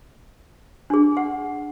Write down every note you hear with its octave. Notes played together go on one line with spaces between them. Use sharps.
D4 G#4
F#5